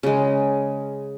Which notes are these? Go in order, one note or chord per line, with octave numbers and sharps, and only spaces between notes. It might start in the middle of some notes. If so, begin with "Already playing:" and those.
C#3 G#3